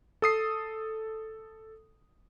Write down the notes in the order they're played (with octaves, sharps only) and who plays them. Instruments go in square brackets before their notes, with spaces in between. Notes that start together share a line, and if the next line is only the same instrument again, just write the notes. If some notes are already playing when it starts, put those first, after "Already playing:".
[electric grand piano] A4 D#6 C7